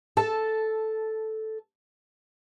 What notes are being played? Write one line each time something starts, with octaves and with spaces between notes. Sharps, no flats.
A4 A5